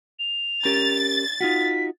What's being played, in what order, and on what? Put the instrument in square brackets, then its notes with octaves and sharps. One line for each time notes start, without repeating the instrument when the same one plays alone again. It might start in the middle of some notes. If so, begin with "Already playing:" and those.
[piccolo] F7
[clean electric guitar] C#4 G4 A#4 [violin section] A6
[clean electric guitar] D#4 F4 F#4 [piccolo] B6